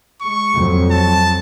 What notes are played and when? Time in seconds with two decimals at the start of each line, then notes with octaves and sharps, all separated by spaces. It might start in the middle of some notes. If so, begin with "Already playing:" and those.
0.21 G#3 C#6
0.56 F2 F#3
0.91 A5